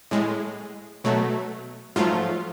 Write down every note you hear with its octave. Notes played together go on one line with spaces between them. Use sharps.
A2 G#3
B2 F#3 A3
G#2 F3 F#3 A3 F4